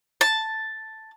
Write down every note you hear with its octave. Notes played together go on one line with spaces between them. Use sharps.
A5